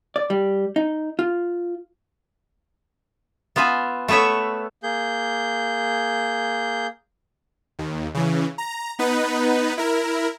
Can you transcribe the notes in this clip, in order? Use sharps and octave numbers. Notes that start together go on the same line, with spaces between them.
D5
G3
D#4
F4
B3 F4 E5 G#5
A3 B3 B4 C#5 E5
A#3 G#4 G6
D#2
C#3 E3
A#5
B3 D#4 B4
E4 A#4